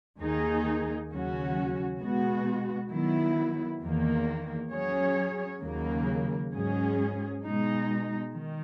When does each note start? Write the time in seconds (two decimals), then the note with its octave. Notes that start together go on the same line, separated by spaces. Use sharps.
0.19 D#2 D#3 A#3 D#4 G#4
1.09 D#2 C#3 F#3 C#4 F#4
2.00 B2 G#3 B3 F#4
2.91 D#3 F#3 B3 E4
3.81 E2 D#3 A#3
4.72 F#3 C#4 G#4 C#5
5.62 D#2 C#3 F#3 A#3
6.53 G#2 F#3 C#4 G#4
7.43 B2 G#3 D#4
8.34 D#3